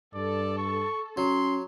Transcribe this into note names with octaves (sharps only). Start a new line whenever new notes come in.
G2 A4 D5
C#6
F#3 C#4 C6